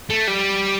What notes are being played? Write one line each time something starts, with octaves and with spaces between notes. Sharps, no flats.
A3
G3